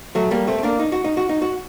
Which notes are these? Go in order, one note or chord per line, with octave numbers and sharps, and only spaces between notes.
F#3 A3
G3 A#3
A3 C4
C4
A#3 D4
D#4
F#4
D#4
F#4
D#4
F#4